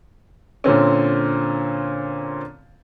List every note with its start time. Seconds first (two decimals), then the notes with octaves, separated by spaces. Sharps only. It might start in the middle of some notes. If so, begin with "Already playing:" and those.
0.64 A#2 D3 C4 C#4